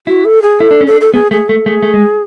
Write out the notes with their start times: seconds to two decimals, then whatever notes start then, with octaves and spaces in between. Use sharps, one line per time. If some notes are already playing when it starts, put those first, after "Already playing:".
0.07 E4 F#4
0.25 A4
0.42 G#4
0.60 E4 A4
0.71 D4
0.81 C#4
0.87 D4 A4
1.01 A4
1.14 B3 G#4
1.31 A3 G#4
1.48 A3 A4
1.66 A3 G#4
1.83 A3
1.94 G#3